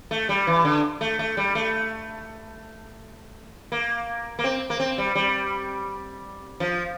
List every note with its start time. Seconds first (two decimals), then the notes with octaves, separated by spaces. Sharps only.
0.11 A3
0.29 G3
0.47 E3
0.65 D3
1.01 A3
1.19 A3
1.37 G3
1.55 A3
3.72 A#3
4.39 A#3
4.44 C4
4.70 A#3
4.80 C4
4.98 G3
5.15 G3
6.60 F3